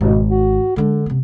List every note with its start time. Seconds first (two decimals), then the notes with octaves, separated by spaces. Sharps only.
0.01 G#1 B2
0.29 F#4
0.76 D3 G#3 D4
1.06 C3 B3